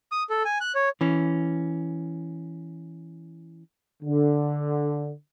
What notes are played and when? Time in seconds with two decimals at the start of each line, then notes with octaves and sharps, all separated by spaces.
0.12 D#6
0.30 A4
0.45 G#5
0.61 F#6
0.75 C#5
1.01 E3 C#4
4.03 D3